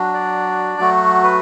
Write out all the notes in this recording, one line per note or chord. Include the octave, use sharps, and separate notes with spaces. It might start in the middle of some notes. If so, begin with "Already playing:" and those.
Already playing: F#3 D4 F#4
D5
F#3 A3 F#4
B4